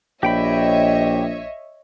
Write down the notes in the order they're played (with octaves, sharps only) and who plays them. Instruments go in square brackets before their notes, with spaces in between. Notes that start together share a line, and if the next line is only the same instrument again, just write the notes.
[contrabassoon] A#1 [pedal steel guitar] G4 G5 B5 [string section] C#5 D#5 E5